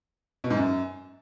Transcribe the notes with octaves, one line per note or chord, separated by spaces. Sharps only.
B2
G#2
F#2